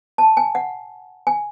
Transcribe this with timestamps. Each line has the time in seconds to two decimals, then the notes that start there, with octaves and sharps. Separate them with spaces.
0.18 A5
0.37 G#5
0.55 F#5
1.27 G#5